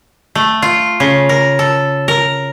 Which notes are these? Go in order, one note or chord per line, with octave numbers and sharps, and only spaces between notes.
A3
F4
C#3
A#4
A4
A#4